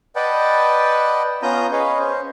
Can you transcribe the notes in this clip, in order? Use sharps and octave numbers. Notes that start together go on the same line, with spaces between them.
B4 D5 D#5 F#5 G5 A5
B3 C#4 F4 A#5 D#6 G6
G#4 B4 C#5 D#5 F5
C#4 C5